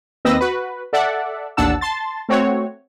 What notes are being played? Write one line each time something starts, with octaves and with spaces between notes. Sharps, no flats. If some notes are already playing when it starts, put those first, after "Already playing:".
D#2 C4 B4 D#5 E6 A#6
F#4 B4
A4 D5 E5 F#5
A1 D#2 D4 F#5 A5 E6
A5 C6 A6
A3 C4 F#4 C#5